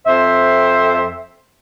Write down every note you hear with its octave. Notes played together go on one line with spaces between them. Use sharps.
F2 C5 E5